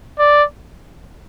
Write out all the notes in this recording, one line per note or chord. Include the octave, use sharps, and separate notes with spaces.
D5